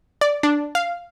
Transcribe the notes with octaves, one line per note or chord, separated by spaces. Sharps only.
D5
D4
F5